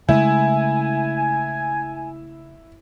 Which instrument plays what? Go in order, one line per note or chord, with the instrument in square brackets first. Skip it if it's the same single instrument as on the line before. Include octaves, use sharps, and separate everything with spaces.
[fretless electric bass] C#3 G#3 A3 [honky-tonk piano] E4 [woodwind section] G#5